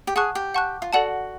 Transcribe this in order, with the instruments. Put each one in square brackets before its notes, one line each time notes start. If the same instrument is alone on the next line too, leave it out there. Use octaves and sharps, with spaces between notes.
[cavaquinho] G4
[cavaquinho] G#4 [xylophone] F#5 A5 C#6 F#6
[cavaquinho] G4
[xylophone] F#5 A5 C#6 F#6
[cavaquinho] F4
[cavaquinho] F#4 [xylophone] A4 D5 F#5 A5